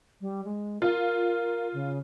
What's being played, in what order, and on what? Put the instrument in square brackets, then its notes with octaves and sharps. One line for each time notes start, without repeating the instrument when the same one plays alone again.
[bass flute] G3
G#3
[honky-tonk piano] F4 [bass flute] A#4
[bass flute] C#3